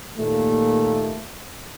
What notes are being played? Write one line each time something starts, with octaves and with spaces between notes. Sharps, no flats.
D#2 A#2 A3